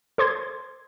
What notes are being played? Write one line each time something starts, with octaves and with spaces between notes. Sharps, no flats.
A4 C5 C6 D6 G#6